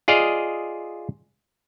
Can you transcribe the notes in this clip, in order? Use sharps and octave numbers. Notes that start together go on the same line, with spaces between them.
F4 G#4 D5 D#5 F5